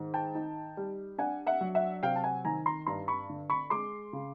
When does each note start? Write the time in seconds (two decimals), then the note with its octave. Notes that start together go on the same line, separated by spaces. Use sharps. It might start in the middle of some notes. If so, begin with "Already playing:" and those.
Already playing: G#2 D#3
0.14 G5 A5
0.35 D#4
0.77 G3
1.18 D4 F#5 G#5
1.46 E5 F#5
1.61 F#3
1.75 E5 F#5
2.03 C3 F5 G5
2.16 A5
2.24 F#5 G#5
2.45 D#3 G#5 A#5
2.66 A#5 C6
2.87 G2 A#5 C6
3.08 B5 C#6
3.29 D3
3.50 B5 C#6
3.70 G#3 C6 D6
4.13 C#3